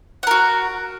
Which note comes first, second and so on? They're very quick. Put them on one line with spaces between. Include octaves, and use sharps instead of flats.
F#5 A#4 F#4